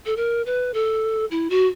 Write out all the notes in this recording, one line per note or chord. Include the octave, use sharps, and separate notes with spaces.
A4
A#4
B4
A4
E4
F#4